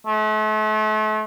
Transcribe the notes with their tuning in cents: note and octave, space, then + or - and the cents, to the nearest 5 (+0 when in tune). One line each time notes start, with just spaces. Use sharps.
A3 -40